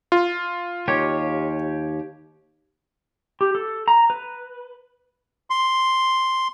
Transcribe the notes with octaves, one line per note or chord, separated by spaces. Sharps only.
F4
D#2 G4 C#5
G4
A4
A#5
B4
C6